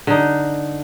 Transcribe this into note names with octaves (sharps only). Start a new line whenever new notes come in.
D3 D#4